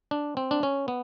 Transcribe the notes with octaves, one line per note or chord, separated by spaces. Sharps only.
D4
C4
D4
C#4
B3